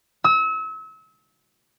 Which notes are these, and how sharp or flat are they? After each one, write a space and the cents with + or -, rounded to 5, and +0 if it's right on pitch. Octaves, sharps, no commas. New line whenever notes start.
E6 -35